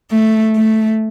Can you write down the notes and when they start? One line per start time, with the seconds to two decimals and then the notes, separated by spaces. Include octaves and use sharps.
0.11 A3
0.56 A3